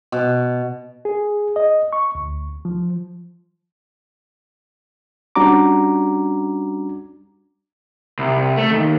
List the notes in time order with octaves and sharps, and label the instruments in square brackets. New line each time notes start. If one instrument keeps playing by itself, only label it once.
[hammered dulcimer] B2
[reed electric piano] G#4
D#5
C#6
D2
F3
G3 C#4 D4 F#4 A#5 D6
[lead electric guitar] C2
A3
D#2